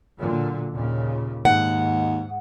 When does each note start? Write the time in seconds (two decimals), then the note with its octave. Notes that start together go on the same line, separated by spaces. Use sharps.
0.19 A#2 D3 F#3
0.74 D#2 A#2 C#3
1.45 D#2 G#2 F#5